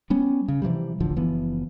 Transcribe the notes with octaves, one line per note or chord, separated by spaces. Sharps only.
G3 B3 C#4
C#3
C3 E3 F3 G3
D1 A1 D3 F3
F#1 E3 F3 B3